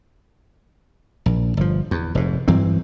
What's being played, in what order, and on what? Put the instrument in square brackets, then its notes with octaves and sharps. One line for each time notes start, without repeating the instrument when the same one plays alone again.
[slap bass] A#1
G1 F3
E2
F1 G#2
G2 E3 F#3 C4